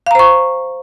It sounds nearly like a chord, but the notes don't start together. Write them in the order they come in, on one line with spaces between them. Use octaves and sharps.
F5 A#5 C5 C#6